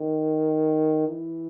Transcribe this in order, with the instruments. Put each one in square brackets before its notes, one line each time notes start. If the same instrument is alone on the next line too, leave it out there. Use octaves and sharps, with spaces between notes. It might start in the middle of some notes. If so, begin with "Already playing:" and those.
Already playing: [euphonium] D#3
E3